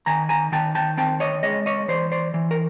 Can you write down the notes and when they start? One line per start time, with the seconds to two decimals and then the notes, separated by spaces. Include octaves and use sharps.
0.06 D#3 G#5 A#5
0.29 G#5 A#5
0.52 D#3 G5 A5
0.75 G5 A5
0.97 C4 G5 A5
1.20 C#5 D#5
1.43 G#3 C#5 D#5
1.66 C#5 D#5
1.88 E3 C5 D5
2.12 C5 D5
2.34 E3
2.51 A#4